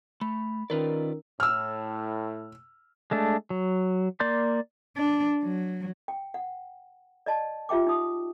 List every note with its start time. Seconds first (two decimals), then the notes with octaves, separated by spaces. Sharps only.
0.21 A3 B5
0.70 D#3 C#4 F4 A#4 B4 D5
1.40 A2 E6 F6
3.11 G#3 A3 D4
3.50 F#3
4.20 A#3 D5 C6 G6
4.96 D4
5.43 F#3
6.08 G5
6.34 F#5
7.26 D5 D#5 A5
7.69 F4 G4 E5 G5 D6
7.87 D#4 D#6